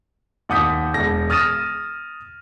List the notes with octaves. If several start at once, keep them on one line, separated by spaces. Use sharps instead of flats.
D#2 F#5 D#6 G6 B6
E1 A#6
D#6 F6 A6 A#6 D#7 E7